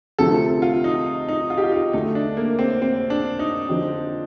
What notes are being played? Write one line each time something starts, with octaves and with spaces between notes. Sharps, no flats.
D2 C3 F3 A3 A4
F4
D#4
D#4
F4
G4
F4
D#4
D2 D3 A3 D#4
D4
A#3
C4
C4
D4
D#4
D3 F3 C4 F4